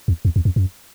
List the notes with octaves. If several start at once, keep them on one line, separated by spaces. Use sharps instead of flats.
E2
E2
E2
F2
F#2